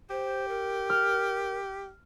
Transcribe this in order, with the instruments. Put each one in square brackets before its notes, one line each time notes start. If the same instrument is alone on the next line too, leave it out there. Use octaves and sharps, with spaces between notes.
[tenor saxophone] G4 [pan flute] C5
[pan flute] A#4
[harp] F6